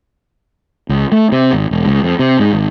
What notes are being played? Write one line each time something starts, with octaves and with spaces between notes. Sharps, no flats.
C#2
A3
C3
G#1
E1
C#2
F2
C3
G#2
G#1